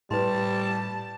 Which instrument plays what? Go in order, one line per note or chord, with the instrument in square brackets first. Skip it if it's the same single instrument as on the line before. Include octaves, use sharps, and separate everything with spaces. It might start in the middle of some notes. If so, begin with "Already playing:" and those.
[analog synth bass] A2 [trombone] G3 [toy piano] B4 C6 [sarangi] A5